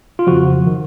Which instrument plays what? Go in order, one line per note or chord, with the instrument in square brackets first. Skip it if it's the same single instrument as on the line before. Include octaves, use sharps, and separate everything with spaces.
[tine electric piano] F4
F2 C#3 F3 F#4
D#3